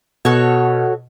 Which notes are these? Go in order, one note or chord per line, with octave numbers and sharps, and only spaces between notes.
B2 F#4 A4 C#5